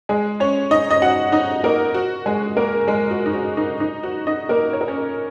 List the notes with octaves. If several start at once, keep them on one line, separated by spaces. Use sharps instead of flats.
G#3 G#4
C#4 C#5
D#4 D#5
D#5
F#4 F#5
D#4 D#5
A#3 A#4
F#4
G#3 G#4
A#3 A#4
G#3 G#4
F#4
D#4
F#4
D#4
D#4
F#4
D#4 D#5
A#3 A#4
C#5
A#4
C#4 C#5